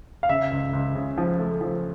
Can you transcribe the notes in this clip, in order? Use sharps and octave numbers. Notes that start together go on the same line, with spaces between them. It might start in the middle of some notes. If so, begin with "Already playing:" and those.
F5
C#3 E5
C#2
C#2
C#3
F3
A3
F3